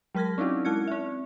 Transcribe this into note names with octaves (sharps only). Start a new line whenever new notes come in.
F#3 G#3 A#4 F6 G#6 A#6
C4 C#4 D#4 E4 F#4
G#3 E4 F#6 G#6 C#7
C4 E5